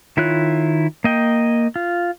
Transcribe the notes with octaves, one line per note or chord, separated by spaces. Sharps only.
D#3 E4 F4 C#5 F#6
A#3 D#5 G5
F4